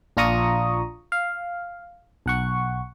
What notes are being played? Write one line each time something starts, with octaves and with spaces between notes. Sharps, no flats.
A#1 D4 F4 A#5 C#6 D#6
F5
B1 F#5 C#6